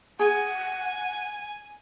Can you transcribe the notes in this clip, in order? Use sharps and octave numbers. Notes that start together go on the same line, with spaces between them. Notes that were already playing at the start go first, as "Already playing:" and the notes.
G#4 F#5 G#5